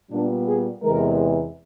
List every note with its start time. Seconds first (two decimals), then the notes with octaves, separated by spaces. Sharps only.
0.11 A#2 G3 B3 D4
0.47 G#4
0.83 E2 C3 E3 G#3 A#4